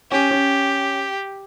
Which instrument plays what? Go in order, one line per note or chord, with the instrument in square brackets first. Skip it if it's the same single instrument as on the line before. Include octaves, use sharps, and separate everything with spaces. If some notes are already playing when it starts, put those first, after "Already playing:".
[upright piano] C#4 [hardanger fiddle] G4
[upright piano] C#4